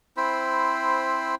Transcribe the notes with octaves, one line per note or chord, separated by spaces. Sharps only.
C4 E4 C5 B5